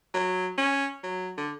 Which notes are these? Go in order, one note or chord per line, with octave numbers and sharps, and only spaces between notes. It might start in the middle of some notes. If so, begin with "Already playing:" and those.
F#3
C#4
F#3
D3